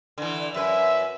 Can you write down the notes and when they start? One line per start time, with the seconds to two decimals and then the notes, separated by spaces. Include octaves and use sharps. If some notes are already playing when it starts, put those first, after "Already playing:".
0.18 D3 E3
0.54 F#2 B4 E5